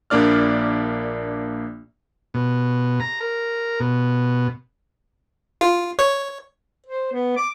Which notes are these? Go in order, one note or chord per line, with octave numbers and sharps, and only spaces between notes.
A#1 A#3 D4 D5 F6
B2
A#5
A#4
B2
F4
C#5
C5
B3
D6